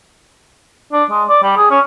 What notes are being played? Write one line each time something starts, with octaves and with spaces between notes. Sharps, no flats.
D4
G#3
D5
G3
G#4
C#4